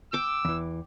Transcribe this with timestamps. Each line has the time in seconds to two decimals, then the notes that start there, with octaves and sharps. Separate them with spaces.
0.13 G5 D6 E6
0.45 E2 E3